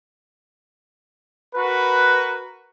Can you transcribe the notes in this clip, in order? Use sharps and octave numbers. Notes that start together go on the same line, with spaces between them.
F#4 A#4 B4